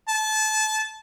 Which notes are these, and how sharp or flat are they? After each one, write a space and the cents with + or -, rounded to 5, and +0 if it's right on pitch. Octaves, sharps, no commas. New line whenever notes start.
A5 -25